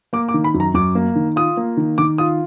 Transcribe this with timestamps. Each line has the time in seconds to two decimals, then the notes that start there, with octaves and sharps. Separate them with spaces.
0.13 A#3 D6
0.29 D6
0.34 D#3
0.44 B5
0.54 F#2
0.60 A#5
0.74 F#2 D6
0.95 A#3
1.16 D#3
1.36 F4 D#6
1.57 A#3
1.77 D#3
1.98 D#3 D6
2.18 F4 D#6